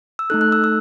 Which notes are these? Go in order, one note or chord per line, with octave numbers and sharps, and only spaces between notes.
E6
A3 D#4 A4 F#6
F#6
E6
E6